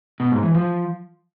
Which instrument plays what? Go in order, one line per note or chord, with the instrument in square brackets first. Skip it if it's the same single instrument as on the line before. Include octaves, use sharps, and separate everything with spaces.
[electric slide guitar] B2
G#2
E3
F3